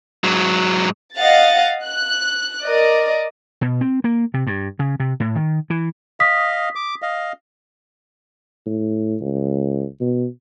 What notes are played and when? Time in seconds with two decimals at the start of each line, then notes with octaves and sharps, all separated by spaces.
0.24 G#2 F#3
1.16 D#5 F5 F#5 A6
1.85 F#6
2.64 A#4 D5 D#5
3.61 B2
3.81 C4
4.04 A#3
4.34 C3
4.47 G2
4.79 C#3
5.00 C3
5.20 A2
5.35 D#3
5.70 E3
6.20 D#5 F5 D#6 B6
6.76 D6
7.02 D#5 F5
8.66 A2
9.21 C#2
10.00 B2